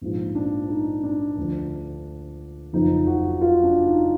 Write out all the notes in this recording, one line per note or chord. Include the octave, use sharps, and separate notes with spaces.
A#1 G#2 F3
D4
D#4
D4
D2 D3 F3
F#1 F2 F3 D#4
F#4
F4
D4
D#4